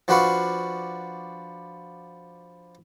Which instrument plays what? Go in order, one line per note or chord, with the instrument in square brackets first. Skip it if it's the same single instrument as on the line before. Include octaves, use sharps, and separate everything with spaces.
[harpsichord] F3 D4 F#4 B4 F5 C#6